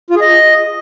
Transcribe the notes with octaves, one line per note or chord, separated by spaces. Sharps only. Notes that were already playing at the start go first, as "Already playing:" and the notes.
F4
G#4
D#5